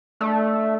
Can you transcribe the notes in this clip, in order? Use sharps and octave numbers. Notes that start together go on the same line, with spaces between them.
A3 D4